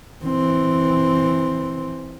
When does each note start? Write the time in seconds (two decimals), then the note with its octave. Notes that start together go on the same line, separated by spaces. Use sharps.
0.25 E3 C4